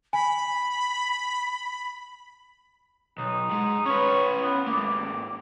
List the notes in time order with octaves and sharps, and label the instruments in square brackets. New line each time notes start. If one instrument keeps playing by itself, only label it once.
[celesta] G#5 [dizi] B5
[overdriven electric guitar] B1 [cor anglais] D#4
[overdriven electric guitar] G#2 G#3
[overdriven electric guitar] C#4 B4 [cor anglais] C#5
[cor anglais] B3
[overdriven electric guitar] G#2 A#3 [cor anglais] D5